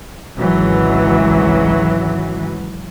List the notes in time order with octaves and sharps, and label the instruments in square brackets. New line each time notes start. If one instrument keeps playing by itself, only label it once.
[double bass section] G#1 C#2 E3 F#3